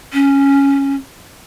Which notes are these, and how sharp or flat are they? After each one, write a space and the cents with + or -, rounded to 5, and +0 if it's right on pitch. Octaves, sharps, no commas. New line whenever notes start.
C#4 +0